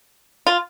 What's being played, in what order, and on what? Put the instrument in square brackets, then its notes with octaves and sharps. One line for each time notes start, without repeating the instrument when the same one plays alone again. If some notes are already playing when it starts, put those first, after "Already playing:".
[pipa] F4